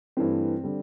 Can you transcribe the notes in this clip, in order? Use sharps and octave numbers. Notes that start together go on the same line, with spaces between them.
G2 E3 A3 C4
D3 G3